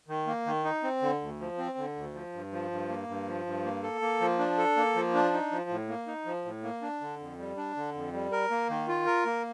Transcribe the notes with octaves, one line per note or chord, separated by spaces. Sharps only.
D#3
A#3
D#3
D#4
C4
D3
D2
F3
C4
D3
D2
F3
G2
F3
G2
A#3
G2
F3
G2
A#3
A4
A#3
F3
D4
A4
A#3
F3
D4
D#4
F3
A2
A#3
D#4
F3
A2
A#3
D4
D3
F2
G3
D4
D3
F2
G3
A#4
A#3
D#3
F4
A#4
A#3